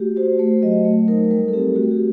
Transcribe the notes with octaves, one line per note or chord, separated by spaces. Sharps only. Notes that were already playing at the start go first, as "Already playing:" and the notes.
Already playing: A3 F#4 G4
F#4 C5
A3 C5
F#3 D#5
A3
D#4 A#4
G3 A#4
A4
C4 G4
A3 F#4
G4